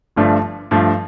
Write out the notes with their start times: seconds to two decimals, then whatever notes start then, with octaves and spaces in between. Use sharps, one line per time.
0.16 G1 G2 F3 A3 D4
0.71 G2 F3 A3